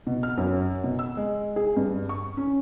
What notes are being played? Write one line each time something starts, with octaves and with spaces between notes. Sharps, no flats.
B2
F6
F#2
B2
E6
G#3
G#4
G2
C#6
C#4